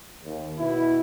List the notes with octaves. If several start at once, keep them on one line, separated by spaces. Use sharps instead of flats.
D#2
B2 E4